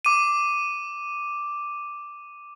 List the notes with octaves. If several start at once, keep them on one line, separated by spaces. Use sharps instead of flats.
D6 D#7